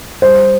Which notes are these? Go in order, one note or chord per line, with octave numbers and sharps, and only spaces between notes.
G3 C5